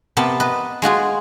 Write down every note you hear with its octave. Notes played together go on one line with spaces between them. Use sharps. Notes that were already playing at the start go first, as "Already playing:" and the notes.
C3 B3 A#4 A5
B4 D#5
G#3 F4 F#4 G#4